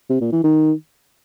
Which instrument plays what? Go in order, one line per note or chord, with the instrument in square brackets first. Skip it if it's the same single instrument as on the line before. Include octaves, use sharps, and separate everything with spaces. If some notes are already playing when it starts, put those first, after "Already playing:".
[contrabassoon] C3
A#2
E3
D#3